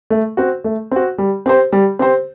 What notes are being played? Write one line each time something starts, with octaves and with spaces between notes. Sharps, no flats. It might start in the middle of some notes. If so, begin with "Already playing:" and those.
A3
C4 F#4
A3
C4 F#4
G3
C4 G4 C5
G3
C4 G4 C5